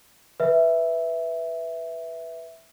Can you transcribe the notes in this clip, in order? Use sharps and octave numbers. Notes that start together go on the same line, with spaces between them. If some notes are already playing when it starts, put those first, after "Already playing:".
B4 E5